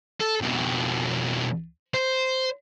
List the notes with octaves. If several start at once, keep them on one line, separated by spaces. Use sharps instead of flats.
A4
F2 B2
C5